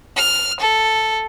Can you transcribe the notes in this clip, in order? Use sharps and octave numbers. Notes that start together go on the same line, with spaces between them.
F6
A4